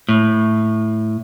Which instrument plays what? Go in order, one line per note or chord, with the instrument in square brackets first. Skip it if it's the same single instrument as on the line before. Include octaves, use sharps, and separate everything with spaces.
[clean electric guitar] A2